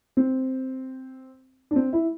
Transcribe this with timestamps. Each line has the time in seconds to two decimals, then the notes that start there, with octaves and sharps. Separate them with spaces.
0.17 C4
1.71 D4
1.76 C4
1.93 E4